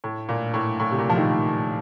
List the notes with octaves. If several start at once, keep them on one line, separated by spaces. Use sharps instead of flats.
A2
A#2
A2
A2
C3
A#2
F3
D#3